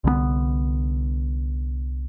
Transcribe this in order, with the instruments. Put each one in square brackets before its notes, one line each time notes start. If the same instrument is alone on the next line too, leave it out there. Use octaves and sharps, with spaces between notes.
[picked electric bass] C2 D3 G3 B3